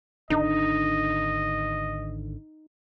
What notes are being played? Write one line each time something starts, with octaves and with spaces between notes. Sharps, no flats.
G#1 D3 D4 D#4 D#5